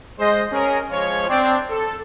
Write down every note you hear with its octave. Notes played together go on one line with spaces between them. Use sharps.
G#3 C5 D#5
C#4 G#4 A#4
F3 G#3 C#4 F4 C#5
C4 D4
A4